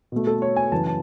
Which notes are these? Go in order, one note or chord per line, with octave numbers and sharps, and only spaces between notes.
B2 A3
A4
C#5
G#5
F#2 C#3 E3 A5
A5